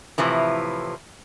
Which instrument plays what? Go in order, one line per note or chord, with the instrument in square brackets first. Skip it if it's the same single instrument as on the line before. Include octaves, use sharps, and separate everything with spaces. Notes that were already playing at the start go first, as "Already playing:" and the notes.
[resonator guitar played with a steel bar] A2 C3 E3 F3